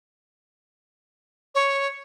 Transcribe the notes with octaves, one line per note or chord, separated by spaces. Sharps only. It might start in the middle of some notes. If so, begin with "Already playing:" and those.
C#5